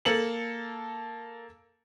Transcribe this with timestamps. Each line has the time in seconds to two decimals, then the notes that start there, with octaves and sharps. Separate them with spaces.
0.05 A#3 A4 A5 C#7 F#7